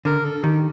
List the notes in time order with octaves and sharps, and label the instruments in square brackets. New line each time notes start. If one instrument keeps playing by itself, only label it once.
[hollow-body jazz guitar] D3 [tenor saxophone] A#4
[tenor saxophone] A4
[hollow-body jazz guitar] D#3 [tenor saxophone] G4